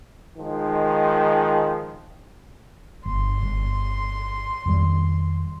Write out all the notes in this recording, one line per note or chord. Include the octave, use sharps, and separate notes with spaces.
D#3 F3 G#3
G1 C6
G1
F2 D#3 G3